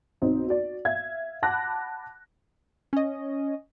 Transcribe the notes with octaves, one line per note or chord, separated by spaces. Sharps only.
B1 C4 D#4
F#4 D5
E5 F5 G#6
F#5 A5 B5 D6 F#6 A#6
C#4 D#5